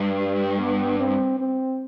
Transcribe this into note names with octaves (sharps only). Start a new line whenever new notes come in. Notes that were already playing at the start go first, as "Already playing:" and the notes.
Already playing: G2
G3
B3
C4
C4